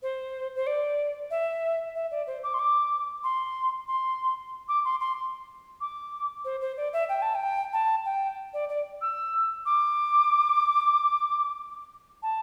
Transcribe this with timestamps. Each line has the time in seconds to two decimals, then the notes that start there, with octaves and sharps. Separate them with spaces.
0.02 C5
0.56 C5
0.67 D5
1.31 E5
1.95 E5
2.11 D5
2.27 C5
2.43 D6
2.54 C6
2.59 D6
3.24 C6
3.88 C6
4.68 D6
4.85 C6
5.00 C6
5.81 D6
6.45 C5
6.61 C5
6.77 D5
6.93 E5
7.09 G5
7.22 A5
7.35 G5
7.73 A5
8.05 G5
8.54 D5
8.69 D5
9.01 E6
9.66 D6
12.23 A5